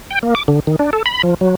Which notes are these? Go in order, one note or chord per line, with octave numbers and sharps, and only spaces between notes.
G5
A#3
D6
D3
D#3
D4
A4
B5
F3
F#3